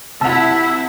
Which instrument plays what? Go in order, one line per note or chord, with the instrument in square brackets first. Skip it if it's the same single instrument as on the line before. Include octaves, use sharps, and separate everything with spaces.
[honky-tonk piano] C3 F#5 [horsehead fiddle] E4 E5 [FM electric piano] A5 E6